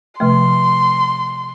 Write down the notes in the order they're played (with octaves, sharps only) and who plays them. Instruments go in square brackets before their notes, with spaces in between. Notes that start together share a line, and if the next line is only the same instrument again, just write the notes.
[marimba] C3 F3 A3 [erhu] C6